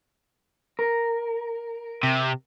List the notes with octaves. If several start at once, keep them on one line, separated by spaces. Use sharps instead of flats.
A#4
C3